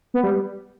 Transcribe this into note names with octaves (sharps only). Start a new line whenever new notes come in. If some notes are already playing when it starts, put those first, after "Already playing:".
B3
G3